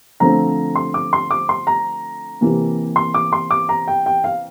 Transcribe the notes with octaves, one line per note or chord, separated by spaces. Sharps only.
D3 F3 A3 C4 A#5
C6
D6
C6
D6
C6
A#5
C3 E3 A#3
C6
D6
C6
D6
A#5
G5
G5
F5